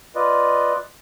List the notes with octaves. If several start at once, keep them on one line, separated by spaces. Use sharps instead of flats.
F4 B4 D5 D#5